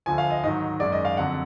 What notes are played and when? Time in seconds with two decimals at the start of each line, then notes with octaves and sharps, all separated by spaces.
0.06 D2 D3 F3 G#5
0.18 F5
0.30 D#5
0.43 G#2 D#3 F#3 D#5
0.80 F#2 D#3 G#3 D5
0.92 D#5
1.05 F5
1.17 F2 D3 F#3 F#5